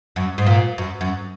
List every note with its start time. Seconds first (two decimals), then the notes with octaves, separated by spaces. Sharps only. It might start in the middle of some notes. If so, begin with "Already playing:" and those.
0.16 F#2
0.38 G#2
0.46 A#2
0.78 F#2
1.01 F#2